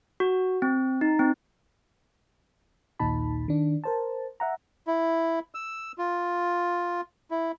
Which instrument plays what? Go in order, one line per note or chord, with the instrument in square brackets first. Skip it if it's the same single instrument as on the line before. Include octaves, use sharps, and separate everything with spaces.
[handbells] F#4
C4
D#4
C4
[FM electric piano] A#1 D#2 A#2 D#4 A5 B5
D#3 D4
A#4 C5 A5
E5 F#5 A#5
[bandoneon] E4
E6
F4
E4